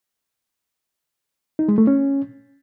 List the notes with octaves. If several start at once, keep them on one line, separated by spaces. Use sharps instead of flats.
D#4
G#3
A3
C#4